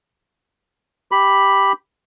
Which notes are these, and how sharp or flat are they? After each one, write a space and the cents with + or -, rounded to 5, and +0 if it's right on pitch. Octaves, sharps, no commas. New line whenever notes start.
G4 +0 B5 +0